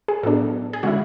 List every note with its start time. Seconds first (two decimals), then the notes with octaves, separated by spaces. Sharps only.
0.08 G#4
0.23 A2 F#3 B3 D4 A4
0.73 G#4
0.83 D3 G#3 C#4 E4 F#4